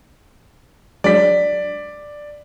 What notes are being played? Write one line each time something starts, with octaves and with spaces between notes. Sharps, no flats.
F#3 G#3 D4 D5 B6